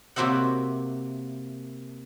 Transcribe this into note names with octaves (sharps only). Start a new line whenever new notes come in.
C3 A#3 F#4 C5 E5 F#5